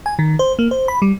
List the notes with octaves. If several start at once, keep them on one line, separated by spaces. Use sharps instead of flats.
G#5
D#3
C5
A#3
C5
B5
G3